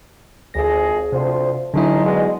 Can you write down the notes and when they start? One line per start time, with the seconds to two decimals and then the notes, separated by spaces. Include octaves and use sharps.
0.54 G#1 D2 F3 G#4 A#6
1.12 D2 C3 F3 C5
1.74 G#1 D3 F#3 G#3 D#4 E4
2.05 B2 G3 G#3